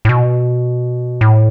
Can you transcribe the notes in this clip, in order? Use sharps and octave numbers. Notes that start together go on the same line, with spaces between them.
A2
B2
A2